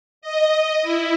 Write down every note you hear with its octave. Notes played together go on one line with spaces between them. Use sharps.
D#5
E4